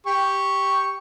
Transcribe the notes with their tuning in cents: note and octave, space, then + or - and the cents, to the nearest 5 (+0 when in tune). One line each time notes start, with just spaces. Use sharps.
G4 +0 C#6 +0